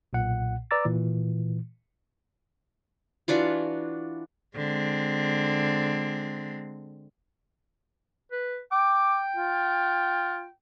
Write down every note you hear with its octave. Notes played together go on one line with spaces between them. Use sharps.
B1 A#2 F#5
B4 D5 A#5 D6 E6 A6
A#2 E3
E3 D4 F4 F#4
D3 G#3 C4
B4
G5 D6
F4